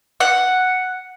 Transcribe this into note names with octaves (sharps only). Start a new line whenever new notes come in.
F#5